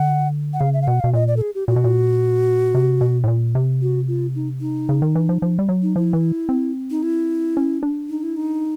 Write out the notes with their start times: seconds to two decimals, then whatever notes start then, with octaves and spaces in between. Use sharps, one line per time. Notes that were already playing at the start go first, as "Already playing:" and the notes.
Already playing: D3 F#5
0.53 F#5
0.60 C#3 F5
0.74 E5
0.82 F5
0.87 B2 F#5
1.00 B2 F5
1.14 A#2 D#5
1.28 D5
1.37 A4
1.41 G#4
1.55 G4
1.68 A#2 F#4
1.76 B2
1.84 A#2
2.75 C3
3.01 B2
3.24 A2
3.28 A#2
3.55 C3
3.82 F#4
4.08 F4
4.35 D#4
4.61 D#4
4.89 C#3
5.02 D#3
5.15 E3
5.29 F3
5.42 F3
5.59 G3
5.69 F#3
5.82 D#4
5.96 F3 E4
6.13 E3
6.49 C4
6.91 D#4
7.03 E4
7.57 C#4
7.83 D4
8.09 D#4
8.23 E4
8.37 D#4